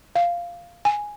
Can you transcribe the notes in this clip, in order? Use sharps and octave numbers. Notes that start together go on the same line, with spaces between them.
F5
G#5